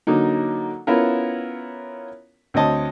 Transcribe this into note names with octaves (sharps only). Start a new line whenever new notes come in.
D3 F#3 A#3 D#4
B3 C#4 E4 F4 A#4
D2 C4 C#5 D#5 A5